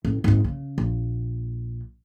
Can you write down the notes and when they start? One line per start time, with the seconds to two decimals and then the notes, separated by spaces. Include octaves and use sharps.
0.05 A1
0.24 G#1 G#2
0.44 C#3
0.78 A#1